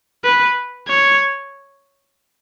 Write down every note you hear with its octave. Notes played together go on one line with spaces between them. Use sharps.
B4
C#5